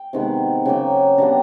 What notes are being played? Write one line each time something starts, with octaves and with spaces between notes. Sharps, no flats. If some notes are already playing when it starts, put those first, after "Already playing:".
Already playing: G5
C3 D#3 G#3 B3
C#3 F#3 A#3 G5
D3 G3 B3 A#5